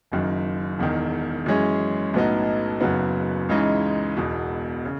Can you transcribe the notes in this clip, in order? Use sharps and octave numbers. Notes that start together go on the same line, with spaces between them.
F#1 F#2 D#3
E1 E2 D#3
F#2 E3 G#3 C#4 G#4
B1 A2 F#3 B3 D#4
F#1 F#2 C#3 F#3 B3
C#2 C#3 E3 G#3 D#4
E1 E2 B2
C#3